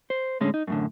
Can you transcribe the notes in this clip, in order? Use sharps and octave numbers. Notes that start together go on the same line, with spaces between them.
C5
A2 D3 G#3 C#4
D#4
F#2 A2 D3